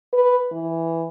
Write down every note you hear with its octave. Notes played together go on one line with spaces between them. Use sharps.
B4
E3